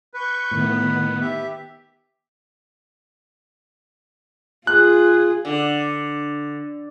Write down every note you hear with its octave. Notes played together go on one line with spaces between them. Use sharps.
B4 C#6 G6
A2 D#3 B3
G4 E5
F4 G#4 F#6
D3